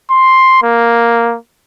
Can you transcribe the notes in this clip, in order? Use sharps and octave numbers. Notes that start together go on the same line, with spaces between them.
C6
A#3